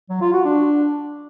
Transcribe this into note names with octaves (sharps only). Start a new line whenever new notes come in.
F#3
F4
F#4
D4